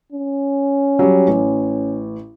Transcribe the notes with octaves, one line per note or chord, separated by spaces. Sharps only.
C#4
F#3 G3
A1